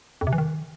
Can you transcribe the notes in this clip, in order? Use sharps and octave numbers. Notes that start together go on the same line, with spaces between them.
F2
C3
E3
D#3